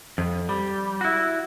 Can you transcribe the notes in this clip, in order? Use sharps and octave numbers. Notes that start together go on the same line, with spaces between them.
F2
G3
E4 F#4